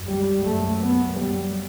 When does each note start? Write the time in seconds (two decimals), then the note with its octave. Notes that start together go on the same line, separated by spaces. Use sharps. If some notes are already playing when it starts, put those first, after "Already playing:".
Already playing: F#2
0.08 G3
0.45 F#2 A3
0.82 B3
1.18 F#2 G3